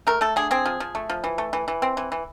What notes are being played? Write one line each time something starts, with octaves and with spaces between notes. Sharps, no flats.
A3 A#4
A3 A4
D3 G#4
C4 G#4
F3
F3
A3
F3
E3
A3
E3
E3
C4
E3
E3